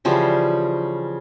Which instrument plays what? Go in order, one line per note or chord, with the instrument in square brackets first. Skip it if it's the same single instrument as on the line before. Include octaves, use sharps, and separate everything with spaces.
[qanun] C#3 E3 F3 G3